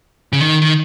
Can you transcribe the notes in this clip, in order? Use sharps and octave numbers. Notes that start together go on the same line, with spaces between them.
C#3
D#3
D#3